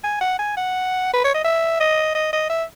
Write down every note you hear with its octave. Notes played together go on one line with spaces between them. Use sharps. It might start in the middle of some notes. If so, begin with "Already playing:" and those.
G#5
F#5
G#5
F#5
B4
C#5
D#5
E5
D#5
D#5
D#5
E5